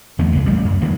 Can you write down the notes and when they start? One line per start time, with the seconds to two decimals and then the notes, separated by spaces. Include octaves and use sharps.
0.19 E2 D#3 A3 B3
0.32 C#2 G2
0.46 A1 G3 G#3
0.65 F#2
0.81 D#3 E3 G3 A#3